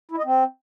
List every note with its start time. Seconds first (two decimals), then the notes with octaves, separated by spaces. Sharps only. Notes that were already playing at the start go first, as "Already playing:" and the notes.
0.11 E4
0.18 D#5
0.25 C4